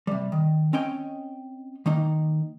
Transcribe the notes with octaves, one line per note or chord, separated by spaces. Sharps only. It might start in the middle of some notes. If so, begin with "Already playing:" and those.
C3 G3
D#3
C4 C#4 C#5 D#5 G5
D#3 A#3 D#4